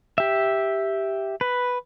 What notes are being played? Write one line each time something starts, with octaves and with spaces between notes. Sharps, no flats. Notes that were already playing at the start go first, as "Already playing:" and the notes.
G4 E5
B4